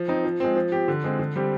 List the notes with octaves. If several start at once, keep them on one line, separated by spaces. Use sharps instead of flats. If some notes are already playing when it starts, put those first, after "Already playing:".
Already playing: F3
C4 D#4
F3
G#3 C4
F3
C4 G4
D3
G#3 C4
D3
G3 C4 G4